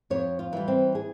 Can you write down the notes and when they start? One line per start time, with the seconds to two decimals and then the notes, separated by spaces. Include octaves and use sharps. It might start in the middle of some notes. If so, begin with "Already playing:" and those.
0.10 F2 C#5
0.39 F4
0.53 E3 G3
0.68 C4
0.95 G#4